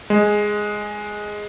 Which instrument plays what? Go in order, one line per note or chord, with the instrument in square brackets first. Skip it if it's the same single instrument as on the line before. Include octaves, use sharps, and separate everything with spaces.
[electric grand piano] G#3